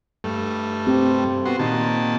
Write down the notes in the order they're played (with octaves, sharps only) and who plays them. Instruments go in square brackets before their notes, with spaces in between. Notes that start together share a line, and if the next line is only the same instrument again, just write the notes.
[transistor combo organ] G2 A3
[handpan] C4 G4
[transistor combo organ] B3 F#4 C6
A#2 D#3 A5